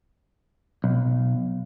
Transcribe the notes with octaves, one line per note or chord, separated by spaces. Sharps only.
B1